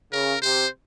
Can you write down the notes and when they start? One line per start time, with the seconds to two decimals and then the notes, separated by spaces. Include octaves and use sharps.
0.12 C#3 A#4
0.42 C3 C5